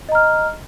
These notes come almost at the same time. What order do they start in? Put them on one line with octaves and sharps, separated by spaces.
D#5 A#5 F6